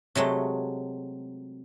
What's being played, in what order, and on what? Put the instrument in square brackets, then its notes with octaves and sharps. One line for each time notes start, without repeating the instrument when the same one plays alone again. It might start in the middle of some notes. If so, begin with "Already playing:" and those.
[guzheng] C3 F#3 G#3 A3